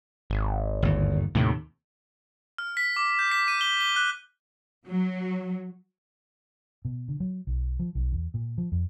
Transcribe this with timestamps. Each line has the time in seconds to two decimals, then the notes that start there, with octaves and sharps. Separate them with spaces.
0.30 G#1
0.82 G1 D#2
1.35 D#2 A2 C3 D#3
2.58 F6
2.77 B6
2.96 D6
3.19 G6
3.31 B6
3.48 D#7
3.61 G7
3.81 G7
3.96 F#6
4.87 F#3
6.85 B2
7.08 D3
7.20 F#3
7.47 B1
7.79 F3
7.95 B1
8.12 E2
8.34 A#2
8.58 F3
8.72 F2